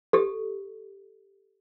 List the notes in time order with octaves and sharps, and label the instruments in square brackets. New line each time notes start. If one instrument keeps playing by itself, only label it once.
[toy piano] G4 A4